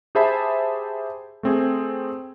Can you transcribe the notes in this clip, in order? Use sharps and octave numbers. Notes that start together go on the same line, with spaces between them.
G4 G#4 C5 E5 A5 B5
A3 C4 G#4